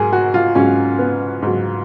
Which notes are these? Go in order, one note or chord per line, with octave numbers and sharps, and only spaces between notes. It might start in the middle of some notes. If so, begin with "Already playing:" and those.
Already playing: G#2 F#3 G#4 A#4
F#4
F4
G#2 F#3 C#4
B3
G#2 F#3